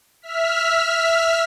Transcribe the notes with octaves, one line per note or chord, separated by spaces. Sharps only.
E5 F6 B6